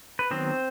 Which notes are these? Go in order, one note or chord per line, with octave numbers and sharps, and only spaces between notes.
B4
D#3 F#3 B3 C4 C5